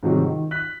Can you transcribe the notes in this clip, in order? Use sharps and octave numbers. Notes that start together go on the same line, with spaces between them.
G#2 C3 D#3 F#3 G3
D#3
F#6 B6